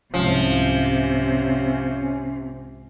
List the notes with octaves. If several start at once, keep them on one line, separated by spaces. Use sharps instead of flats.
C2 G#2 C3 F3 C#4